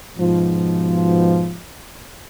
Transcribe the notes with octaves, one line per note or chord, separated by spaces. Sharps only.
G#2 B2 F3